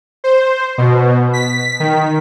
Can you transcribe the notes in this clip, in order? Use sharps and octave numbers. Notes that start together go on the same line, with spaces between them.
C5
B2
B6
D#3